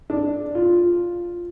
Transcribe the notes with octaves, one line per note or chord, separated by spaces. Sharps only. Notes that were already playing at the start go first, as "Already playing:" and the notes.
D4
F4